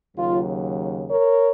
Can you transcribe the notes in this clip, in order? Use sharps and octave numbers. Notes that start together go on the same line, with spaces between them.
D#2 C#3 F#3 F4
A#4 C#5